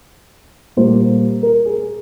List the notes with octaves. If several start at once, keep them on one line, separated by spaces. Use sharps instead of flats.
A#2 G3 A#3 C5
A#4
G#4